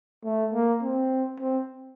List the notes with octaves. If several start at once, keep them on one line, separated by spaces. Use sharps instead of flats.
A3
A#3
C4
C4